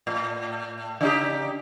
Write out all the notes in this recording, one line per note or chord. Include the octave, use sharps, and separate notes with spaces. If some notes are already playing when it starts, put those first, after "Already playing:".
A2
C#3 D#4 G4